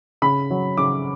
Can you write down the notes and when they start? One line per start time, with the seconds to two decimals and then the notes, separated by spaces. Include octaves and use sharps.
0.22 C#3 B5
0.50 F#3
0.77 C#3 D6